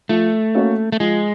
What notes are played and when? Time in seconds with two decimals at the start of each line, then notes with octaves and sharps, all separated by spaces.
0.09 F3 A3
0.55 A#3 C#4 F#4
0.92 A3
1.00 F3 G#3